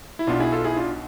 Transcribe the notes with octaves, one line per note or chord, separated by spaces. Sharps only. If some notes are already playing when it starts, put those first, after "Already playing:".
E4
B1 B2 B3 D4 F4
E4 G#4
F4 A4
E4 G#4
D4 F4